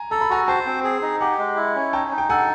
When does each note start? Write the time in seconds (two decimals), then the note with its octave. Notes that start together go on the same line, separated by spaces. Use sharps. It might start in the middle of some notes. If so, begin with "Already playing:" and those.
Already playing: G#5 A#5
0.11 A4 A#5
0.21 B5
0.30 F#4 G#5 A#5
0.48 C5 G5 A5
0.66 C4
0.84 G#4
1.02 D#4
1.20 G4 F#5 G#5
1.39 G#3
1.56 E4
1.75 C#4
1.93 D#4 G5 A5
2.12 D#4
2.18 G5
2.30 A4 F#5 G#5